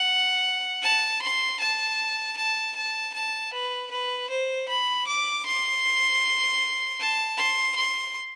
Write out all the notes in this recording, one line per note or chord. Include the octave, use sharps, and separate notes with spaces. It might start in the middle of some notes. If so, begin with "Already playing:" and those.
Already playing: F#5
A5
C6
A5
A5
A5
A5
B4
B4
C5
B5
D6
C6
A5
C6
C6